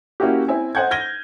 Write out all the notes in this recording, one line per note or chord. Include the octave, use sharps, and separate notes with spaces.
A#3 C#4 E4 F#4 G4
C4 E4 E5 G#5
C5 D#5 F#5 G6 G#6
F6 G#6 A#6 D#7 G7